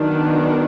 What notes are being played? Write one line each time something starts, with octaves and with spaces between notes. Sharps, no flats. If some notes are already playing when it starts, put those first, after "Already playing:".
Already playing: D#3 F#3 B3 D4